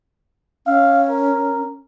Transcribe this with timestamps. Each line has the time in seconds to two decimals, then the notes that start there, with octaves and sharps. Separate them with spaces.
0.67 C#4 F5
1.10 A#4